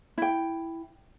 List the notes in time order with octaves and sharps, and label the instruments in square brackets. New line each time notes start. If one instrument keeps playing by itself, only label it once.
[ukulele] E4 G5